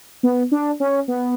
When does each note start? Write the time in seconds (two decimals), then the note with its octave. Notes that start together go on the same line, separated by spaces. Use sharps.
0.23 B3
0.52 D4
0.80 C#4
1.08 B3